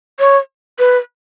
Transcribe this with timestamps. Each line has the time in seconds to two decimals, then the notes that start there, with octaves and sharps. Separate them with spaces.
0.20 C#5
0.79 B4